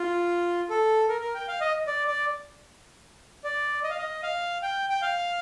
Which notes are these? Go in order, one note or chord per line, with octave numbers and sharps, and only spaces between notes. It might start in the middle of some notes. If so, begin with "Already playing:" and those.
Already playing: F4
A4
A#4
A#4
G5
F5
D#5
D5
D5
D5
D#5
F5
D#5
F5
G5
G5
F5